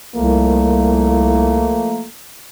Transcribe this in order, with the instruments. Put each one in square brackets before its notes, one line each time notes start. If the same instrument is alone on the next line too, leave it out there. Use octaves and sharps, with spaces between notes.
[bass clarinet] C2 [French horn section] F3 A3 A#3